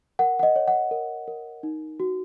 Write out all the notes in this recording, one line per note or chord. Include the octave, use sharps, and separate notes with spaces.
A#4 F#5
F#5
D#5
C#5
F#5
A#4
A#4
D#4
F#4